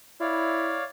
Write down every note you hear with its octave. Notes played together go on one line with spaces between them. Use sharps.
E4 C#5 D5 F5